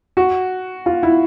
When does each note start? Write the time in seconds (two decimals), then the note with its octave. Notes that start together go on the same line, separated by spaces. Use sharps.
0.17 F#4
0.86 F4
1.03 E4